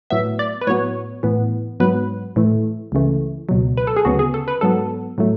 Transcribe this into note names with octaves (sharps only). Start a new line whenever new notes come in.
A2 F#3 B3 E5
D5
B4
A2 F#3 B3 C#5
A2 E3 B3
G#2 F#3 B3 B4
A2 E3 A3
C#2 C#3 E3 A3
C#2 B2 F#3
B4
A4
G#4
D2 C#3 F#3 B3 F#4
G#4
A4
B4
G#2 F#3 B3 A4
A2 F#3 A3